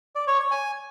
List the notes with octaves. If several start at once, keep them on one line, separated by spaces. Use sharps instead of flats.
D5
C#5
C#5
G#5